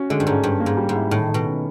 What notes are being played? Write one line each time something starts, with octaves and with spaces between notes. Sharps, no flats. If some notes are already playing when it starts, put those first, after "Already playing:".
Already playing: C#4 F#4
D3 G#3
G2
G#2 C#4
G2 C#4
A#3
G#2
G3
G#2
E4
A2 D#3
D#3
B2
C#4